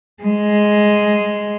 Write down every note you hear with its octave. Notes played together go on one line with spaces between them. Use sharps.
G#3